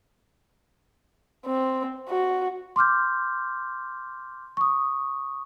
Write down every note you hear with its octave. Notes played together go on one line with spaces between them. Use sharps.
C4
F#4
C6 D6 F6 G6
C#6 D#6